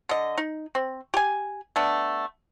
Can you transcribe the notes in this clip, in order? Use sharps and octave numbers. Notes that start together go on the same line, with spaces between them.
D3 D#5
D#4
C4
G4 G#5
A3 B3 D4